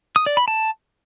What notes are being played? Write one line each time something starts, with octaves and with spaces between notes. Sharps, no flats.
D#6
D5
B5
A5